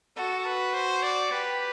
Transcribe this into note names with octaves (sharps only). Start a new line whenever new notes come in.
F#4 A4
B4
C5
D5
G4 B4